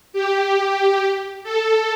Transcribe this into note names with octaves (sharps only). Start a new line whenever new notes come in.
G4
A4